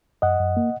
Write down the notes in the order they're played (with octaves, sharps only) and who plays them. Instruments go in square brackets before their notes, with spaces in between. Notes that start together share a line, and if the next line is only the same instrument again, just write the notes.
[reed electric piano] F#2 D#5 F#5
F#2
A#3